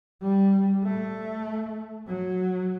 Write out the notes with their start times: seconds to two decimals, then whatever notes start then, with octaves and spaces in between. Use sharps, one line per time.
0.22 G3
0.85 A3
2.08 F#3